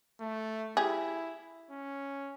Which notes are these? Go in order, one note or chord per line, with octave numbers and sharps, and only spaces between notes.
A3
E4 G4 G#4
C#4